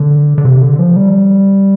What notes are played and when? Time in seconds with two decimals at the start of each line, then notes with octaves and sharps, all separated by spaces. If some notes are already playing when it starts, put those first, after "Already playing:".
Already playing: D3
0.38 D3
0.45 C3
0.62 D3
0.79 F3
0.96 G3